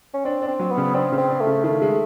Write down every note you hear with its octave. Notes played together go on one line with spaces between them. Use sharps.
C#4
C4 D4
D4
C4
F#3
B3
C#3
C4 D4
C#3
C4
D4
A3
C#3
D#3 A3
G#3